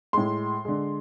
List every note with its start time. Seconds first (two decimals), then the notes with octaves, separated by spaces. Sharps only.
0.13 A2 G#3 C6
0.65 D3 G#3